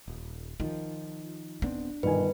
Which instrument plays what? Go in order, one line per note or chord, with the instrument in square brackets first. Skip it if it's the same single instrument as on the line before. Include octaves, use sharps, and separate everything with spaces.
[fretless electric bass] D#1
[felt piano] D#3 [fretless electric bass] F3 [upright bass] F4
[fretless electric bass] D#1 B3 C4 [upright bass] D4
[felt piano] G1 D#3 G#5 [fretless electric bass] G#2 B2 [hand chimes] B4